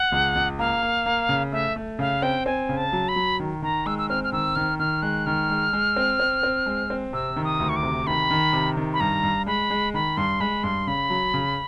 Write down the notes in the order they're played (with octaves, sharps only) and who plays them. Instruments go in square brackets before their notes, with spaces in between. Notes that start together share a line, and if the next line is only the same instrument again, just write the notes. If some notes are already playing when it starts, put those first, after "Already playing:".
Already playing: [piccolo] F#5
[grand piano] C#2
C#2
[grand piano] A#3 [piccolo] F5
[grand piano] A#3
A#3
C#3
[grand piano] A3 [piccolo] E5
[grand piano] A3
[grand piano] C#3 [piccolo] F5
[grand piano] C4 [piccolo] G5
[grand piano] C4 [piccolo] G#5
[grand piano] C#3
[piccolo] A5
[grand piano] F#3
[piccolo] B5
[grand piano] F#3
D#3
[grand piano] D#3 [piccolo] A#5
[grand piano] G#3 [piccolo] E6
[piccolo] E6
[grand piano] C4 [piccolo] F6
[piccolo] F6
[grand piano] D#3 [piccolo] E6
[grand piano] D#3 [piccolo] F6
[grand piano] D#3 [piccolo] F6
[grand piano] G#3 [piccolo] F#6
[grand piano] D#3 [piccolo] F6
[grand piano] G#3
G#3
C4
C4
C4
G#3
C4
[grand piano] C3 [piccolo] E6
[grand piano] D#3
[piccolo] D#6
[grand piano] D2
[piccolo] C#6
D6
[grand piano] C3
[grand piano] D#3 [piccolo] B5
[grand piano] D#3
C3
D#3
[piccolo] B5
[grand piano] G2 [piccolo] A#5
[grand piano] G2
[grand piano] G#3 [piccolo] B5
[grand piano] G#3
[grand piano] D#3 [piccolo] B5
[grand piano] G2 [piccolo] C6
[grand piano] G#3 [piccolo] B5
[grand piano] G2 [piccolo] C6
[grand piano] C#3 [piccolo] B5
[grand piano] F#3
C#3